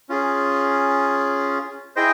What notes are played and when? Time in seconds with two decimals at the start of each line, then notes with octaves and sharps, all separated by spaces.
0.09 C#4 F4 G#4
1.96 E4 G#4 C5 D#5 G5